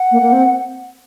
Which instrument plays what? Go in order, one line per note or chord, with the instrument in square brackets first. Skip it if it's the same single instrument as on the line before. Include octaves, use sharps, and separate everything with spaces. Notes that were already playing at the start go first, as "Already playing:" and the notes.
Already playing: [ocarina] F#5
[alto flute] A#3
A#3
C4